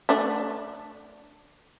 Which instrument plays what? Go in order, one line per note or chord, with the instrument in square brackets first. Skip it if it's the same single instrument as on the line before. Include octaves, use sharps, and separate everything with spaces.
[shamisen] A3 D4